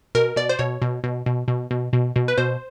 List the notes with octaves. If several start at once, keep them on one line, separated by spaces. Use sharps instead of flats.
B2 A#4
B2 D5
C5
B2 C#5
B2
B2
B2
B2
B2
B2
B2
B4
B2 C5